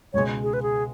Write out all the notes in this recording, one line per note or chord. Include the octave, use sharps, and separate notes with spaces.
C#2 B2 G#3 C#5
G#4
B4
G#4